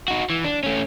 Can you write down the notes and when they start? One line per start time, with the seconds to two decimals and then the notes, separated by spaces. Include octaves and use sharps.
0.08 D#4 F#4
0.30 E3
0.44 D4
0.63 A3 C#4